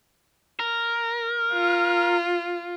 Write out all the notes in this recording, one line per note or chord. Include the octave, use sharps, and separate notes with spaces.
A#4
F4